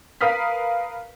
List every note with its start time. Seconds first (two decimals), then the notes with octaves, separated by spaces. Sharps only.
0.21 A#4 B4 F5 D#6 F6 B6